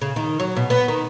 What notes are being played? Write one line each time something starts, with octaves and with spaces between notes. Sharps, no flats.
C#3
D#3
F#3
B2
B3
D#3